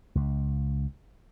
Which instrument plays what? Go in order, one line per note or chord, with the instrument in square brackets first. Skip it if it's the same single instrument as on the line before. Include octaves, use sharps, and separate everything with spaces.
[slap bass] C#2